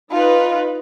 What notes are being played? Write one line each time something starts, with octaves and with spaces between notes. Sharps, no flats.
D#4 F4 B4